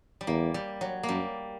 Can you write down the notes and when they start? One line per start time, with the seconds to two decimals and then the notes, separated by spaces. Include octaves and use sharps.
0.21 G3
0.27 E2 A#3
0.54 G3
0.81 F#3
1.03 A#3
1.09 F#2 G3